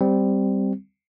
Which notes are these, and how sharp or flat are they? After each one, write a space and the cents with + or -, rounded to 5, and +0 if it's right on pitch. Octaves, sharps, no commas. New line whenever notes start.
G3 +0 C4 -10